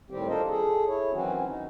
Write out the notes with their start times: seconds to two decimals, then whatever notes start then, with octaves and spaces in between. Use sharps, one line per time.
0.10 A2 D#3 G3 C4 G4
0.28 D4 F4 A4 A#4 C5 D#5
0.48 G#4 A4
0.87 E4 C#5
1.13 D#3 E3 F#3 C4 C#4 F#4
1.47 D#4